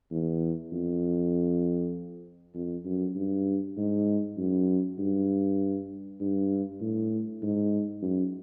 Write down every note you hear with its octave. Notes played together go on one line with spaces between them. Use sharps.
E2
F2
F2
F#2
G2
G#2
F#2
G2
G2
A2
G#2
F#2